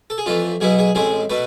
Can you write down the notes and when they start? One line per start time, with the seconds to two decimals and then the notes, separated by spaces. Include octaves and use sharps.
0.10 A4
0.18 G#4
0.26 F2 E3 A3 F4
0.61 B1 B2 B3 E4 G#4
0.79 G#4
0.95 A1 A2 G#3 C4 G#4
1.30 B2 A3 B4